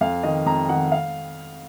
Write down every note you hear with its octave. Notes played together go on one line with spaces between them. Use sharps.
F2 F5
D#3 D#5
F2 A#5
D#3 F#5
F5